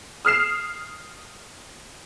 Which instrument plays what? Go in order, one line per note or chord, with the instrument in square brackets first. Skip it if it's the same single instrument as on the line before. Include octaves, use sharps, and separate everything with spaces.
[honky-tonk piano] D#6 F6 C7 E7